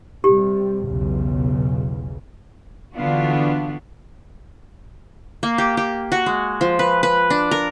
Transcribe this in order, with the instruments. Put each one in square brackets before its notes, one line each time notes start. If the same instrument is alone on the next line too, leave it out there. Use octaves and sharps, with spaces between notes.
[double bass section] C3 G3 [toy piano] G4
[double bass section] B1 E2 C#3
[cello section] D3 E3 B3 D4 F4 F#4
[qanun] A#3
G4
G4
F#4
G#3
F3
B4
B4
D4
A#4